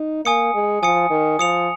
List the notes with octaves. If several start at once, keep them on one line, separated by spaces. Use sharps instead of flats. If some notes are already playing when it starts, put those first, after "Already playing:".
Already playing: D#4
A#3 G#5 D#6 C#7
G#3
F3 G#5 D#6 C#7
D#3
F3 D#6 C#7 F7